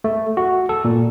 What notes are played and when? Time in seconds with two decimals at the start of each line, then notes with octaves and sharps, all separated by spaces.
0.04 A3
0.37 F#4
0.69 A4
0.85 A#2